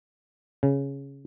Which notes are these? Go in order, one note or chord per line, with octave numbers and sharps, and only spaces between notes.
C#3